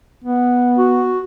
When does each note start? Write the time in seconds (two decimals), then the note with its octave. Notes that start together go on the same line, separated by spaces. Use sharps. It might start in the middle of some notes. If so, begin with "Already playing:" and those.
0.24 B3
0.78 F#4